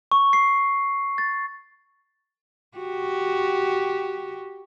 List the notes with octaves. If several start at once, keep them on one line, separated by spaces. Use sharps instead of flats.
C#6
C7
A6
F#4 G4